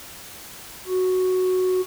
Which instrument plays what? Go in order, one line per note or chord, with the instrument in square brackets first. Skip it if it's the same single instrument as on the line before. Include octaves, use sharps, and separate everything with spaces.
[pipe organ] F#4